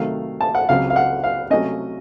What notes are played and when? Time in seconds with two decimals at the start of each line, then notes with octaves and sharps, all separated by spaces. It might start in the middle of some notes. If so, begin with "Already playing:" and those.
Already playing: C3 D#3 F#3 A3 F5
0.41 A5
0.55 F#5
0.69 C#2 C#3 F#3 C4 F5
0.90 F5
0.96 F#5
1.24 F5
1.50 C3 F#3 A3 C#4 D#5